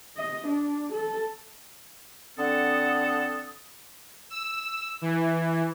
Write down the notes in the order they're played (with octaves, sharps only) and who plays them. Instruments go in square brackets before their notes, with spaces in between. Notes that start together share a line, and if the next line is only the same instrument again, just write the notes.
[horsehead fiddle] D#5
D4
A4
[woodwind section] D3 C4 A4 F#5 D#6
[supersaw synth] E6
E3